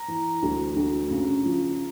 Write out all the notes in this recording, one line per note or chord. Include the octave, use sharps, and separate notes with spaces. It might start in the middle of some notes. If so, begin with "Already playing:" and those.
Already playing: A#5
E3
D2
D2
C#3
F3